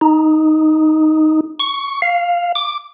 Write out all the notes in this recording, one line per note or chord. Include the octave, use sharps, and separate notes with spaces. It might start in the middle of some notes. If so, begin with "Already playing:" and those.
D#4
C#6
F5
D6